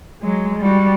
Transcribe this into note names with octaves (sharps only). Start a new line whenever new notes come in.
F#3 G#3
G3 F#4